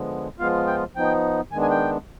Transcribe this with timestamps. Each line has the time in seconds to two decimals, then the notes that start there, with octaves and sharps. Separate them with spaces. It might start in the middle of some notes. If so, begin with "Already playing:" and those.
Already playing: D3 F3 G#3 B3
0.39 F3 G#3 B3 F4 F5
0.67 G5
0.95 F3 B3 D#4 G5
1.51 D#3 G#3 B3 D4 G#5
1.62 G#5
1.71 G5